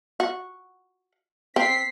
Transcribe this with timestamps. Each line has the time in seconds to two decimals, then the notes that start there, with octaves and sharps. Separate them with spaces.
0.20 F#4
1.56 C4 B6 C7